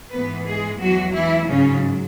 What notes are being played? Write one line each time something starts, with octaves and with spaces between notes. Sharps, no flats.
G#2 E3 G#3 B3 B4
G#3 G#4
E2 E3 F#3 G#3 F#4
E3 E4
G#2 C#3 F#3 C#4